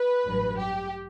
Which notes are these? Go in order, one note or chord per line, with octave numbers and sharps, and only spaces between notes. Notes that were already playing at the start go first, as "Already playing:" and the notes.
Already playing: B4
A1 G2 F#3
G4